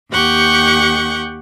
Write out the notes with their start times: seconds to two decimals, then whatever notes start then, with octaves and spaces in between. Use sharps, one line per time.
0.11 D#2 G4 F#5 C#6 G6